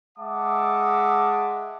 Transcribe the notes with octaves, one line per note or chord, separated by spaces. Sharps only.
G#3 E5 F#5 A5 D6 D#6